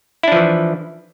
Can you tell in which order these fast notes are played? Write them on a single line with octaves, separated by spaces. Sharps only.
E4 D4 F3 E3